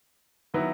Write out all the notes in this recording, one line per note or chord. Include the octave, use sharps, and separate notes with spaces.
D#3 F#3 B3 E4